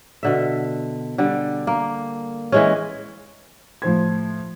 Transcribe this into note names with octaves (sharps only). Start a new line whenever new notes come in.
B2 D3 E5
D3 G3
A#3
E3 G#3 C#4
A2 F3 C5 G#6